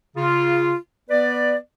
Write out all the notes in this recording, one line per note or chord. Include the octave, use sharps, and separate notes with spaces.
C#3 F4
B3 B4 D5